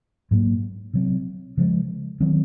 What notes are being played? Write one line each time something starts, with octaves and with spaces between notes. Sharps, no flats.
G#2 F#3 A#3
C3 F#3 C4
C#3 F3 G#3
D#3 F#3 C4